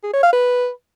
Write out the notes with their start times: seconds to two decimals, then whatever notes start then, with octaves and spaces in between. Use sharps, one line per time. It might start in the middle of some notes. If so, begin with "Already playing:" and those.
0.03 G#4
0.13 C#5
0.23 F5
0.33 B4